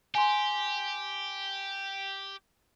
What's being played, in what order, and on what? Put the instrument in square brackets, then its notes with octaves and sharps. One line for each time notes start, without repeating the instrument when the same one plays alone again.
[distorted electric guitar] G4 [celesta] G#5 C6